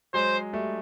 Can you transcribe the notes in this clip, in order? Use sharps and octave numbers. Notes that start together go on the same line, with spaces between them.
F#3 G#3 C5
G3 A3